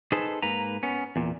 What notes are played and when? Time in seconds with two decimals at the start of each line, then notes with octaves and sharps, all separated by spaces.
0.12 D#4 G#4 A4 B4 C5
0.42 G#2 A#3 B4 A#5
0.83 B3 C#4
1.16 E2 A#2